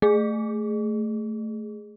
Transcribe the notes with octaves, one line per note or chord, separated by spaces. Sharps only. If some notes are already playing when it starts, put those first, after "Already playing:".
A3 G#4